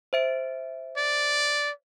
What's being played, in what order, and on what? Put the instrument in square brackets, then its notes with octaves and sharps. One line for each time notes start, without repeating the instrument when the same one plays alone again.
[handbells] C5 E5 D7
[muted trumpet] D5